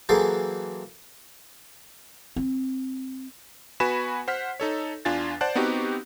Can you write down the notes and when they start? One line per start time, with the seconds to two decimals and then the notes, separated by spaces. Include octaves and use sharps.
0.09 E3 F#3 A#3 G#4 A4 C5
2.36 C4
3.80 B3 F#4 B4 G#5 B5 E7
4.28 C5 F#5 F6 B6
4.60 D#4 A4 C#5
5.05 E2 D4 F4 G#5 A6
5.41 C5 D5 F#5 A5 F#6
5.55 B3 C4 D#4 F#4 G4